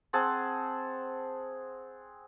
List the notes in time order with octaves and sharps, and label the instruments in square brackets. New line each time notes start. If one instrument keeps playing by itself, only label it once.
[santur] C4 G#4 F#5 A5